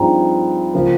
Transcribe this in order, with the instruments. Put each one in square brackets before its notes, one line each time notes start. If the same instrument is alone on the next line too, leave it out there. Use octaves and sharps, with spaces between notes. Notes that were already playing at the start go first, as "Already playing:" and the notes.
Already playing: [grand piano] G2 F3 C4 D#4 G#4 [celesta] G5 A#5
[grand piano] C#3 F3 A#3